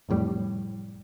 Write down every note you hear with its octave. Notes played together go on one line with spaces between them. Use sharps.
F1 F2 A2 G3